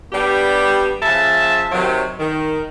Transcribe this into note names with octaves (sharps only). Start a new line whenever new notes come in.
G3 B3 D4 G4
C#3 F3 E5 A5
C3 D#3 F#3
D#3